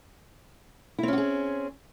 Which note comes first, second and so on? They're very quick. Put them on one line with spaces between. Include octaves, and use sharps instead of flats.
E4 C4 C#4 F#4 G#4